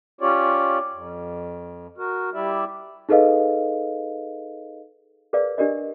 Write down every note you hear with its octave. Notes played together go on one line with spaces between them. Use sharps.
C#4 F4 G4 C#5 D5
F2
F#4 A#4
G3 E4 G4 D5 E5
D#4 G#4 A4 B4 D#5 F5
G#4 A#4 B4 D5 F5
D4 G4 A#4 D5 D#5